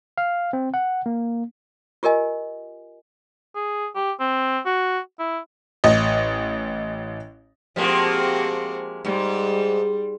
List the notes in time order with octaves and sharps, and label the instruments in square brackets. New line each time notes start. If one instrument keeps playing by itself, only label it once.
[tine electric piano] F5
C4
F#5
A#3
[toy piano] F4 G4 A#4 D#5 G#5
[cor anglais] G#4
G4
C4
F#4
E4
[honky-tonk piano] A1 D#5
[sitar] F3 G#3 A#3 [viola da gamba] C4 F#4 G4
[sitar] G#2 [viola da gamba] G3